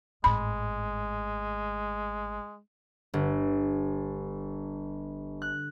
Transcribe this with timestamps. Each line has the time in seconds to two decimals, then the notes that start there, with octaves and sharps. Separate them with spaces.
0.24 G#1 A2 G#3 B5
3.14 G1
5.42 F#6